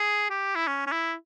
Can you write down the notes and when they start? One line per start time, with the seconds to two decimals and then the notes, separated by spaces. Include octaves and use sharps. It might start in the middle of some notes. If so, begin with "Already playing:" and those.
Already playing: G#4
0.30 G4
0.55 E4
0.67 C#4
0.87 C#4
0.92 E4